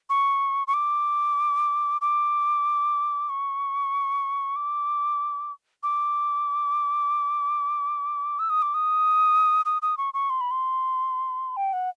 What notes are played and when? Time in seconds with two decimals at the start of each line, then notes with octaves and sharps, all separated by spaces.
0.10 C#6
0.67 C#6
0.74 D6
2.01 D6
3.29 C#6
4.56 D6
5.83 D6
8.39 E6
8.50 D#6
8.62 D6
8.74 D#6
9.65 D#6
9.82 D#6
9.97 C#6
10.14 C#6
10.30 C6
10.41 B5
10.51 C6
11.57 G5
11.73 F#5